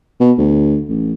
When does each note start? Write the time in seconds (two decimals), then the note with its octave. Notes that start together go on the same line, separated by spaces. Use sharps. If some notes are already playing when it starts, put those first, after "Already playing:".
0.20 B2
0.38 D2
0.89 A1